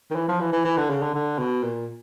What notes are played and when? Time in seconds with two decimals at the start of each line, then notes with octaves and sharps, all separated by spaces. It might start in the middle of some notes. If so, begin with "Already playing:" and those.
0.11 D#3
0.15 E3
0.28 F3
0.40 E3
0.52 E3
0.65 E3
0.77 D3
0.89 C#3
1.02 D3
1.14 D3
1.39 B2
1.63 A#2